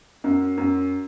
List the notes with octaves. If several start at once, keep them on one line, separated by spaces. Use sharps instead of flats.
F#2
F#2